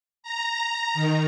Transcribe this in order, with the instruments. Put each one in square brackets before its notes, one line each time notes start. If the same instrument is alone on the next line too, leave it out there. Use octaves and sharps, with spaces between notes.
[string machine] A#5
D#3